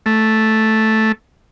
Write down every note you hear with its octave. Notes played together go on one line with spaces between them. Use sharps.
A3